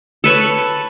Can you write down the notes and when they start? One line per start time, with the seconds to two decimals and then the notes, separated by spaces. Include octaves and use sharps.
0.24 A4 B4 C#5 B5